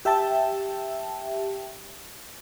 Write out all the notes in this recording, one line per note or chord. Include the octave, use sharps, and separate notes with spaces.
G4 E5 G5 A5